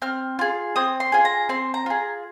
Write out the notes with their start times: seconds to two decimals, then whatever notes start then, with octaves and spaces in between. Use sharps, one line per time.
0.02 C4 F6
0.39 F4 G#4
0.76 C4 D#6
1.00 C6
1.12 F4 G#4 G#5
1.25 A#5
1.49 C4 C6
1.74 A#5
1.86 F4 G#4